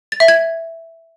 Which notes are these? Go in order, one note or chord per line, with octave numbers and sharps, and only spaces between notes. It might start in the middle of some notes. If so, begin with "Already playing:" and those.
A6
E5
G#6